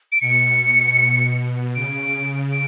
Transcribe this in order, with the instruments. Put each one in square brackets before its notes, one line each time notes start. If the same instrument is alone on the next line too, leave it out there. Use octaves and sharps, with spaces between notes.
[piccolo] D7
[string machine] B2 [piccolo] C#7
[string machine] C#3 [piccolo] D7
[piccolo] D7